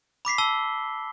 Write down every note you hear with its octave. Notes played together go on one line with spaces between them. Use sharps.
B5 D6 B6 C7
A5 E6 G7